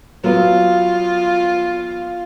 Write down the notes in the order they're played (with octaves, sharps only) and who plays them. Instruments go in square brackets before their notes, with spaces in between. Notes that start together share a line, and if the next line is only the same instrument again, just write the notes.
[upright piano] F#3 B3 [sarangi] F4